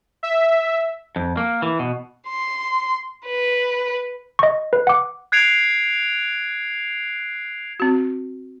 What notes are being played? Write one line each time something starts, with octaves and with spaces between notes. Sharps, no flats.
E5
F2
A#3
E3
B2
C6
B4
D#5 C#6
B4
F#5 D6
F#6 G#6 C7 D7 F7
C4 F#4